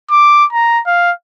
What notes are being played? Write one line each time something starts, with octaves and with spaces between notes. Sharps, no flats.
D6
A#5
F5